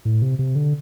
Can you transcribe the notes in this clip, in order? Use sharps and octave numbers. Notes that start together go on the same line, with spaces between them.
A2
C3
C3
D3